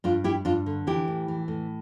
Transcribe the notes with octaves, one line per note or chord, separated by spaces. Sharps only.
G2 D4 F4
G3 E4 G4
G2 D4 F4
D3
E3 E4 G4
A2
E3
A2